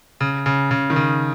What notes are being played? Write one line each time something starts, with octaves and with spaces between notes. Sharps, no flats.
C#3
C#3
C#3
D#3
C#3